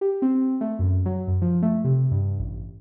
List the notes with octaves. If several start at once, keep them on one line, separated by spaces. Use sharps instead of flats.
G4
C4
A3
F#2
F#3
F#2
F3
A3
C3
G2
A1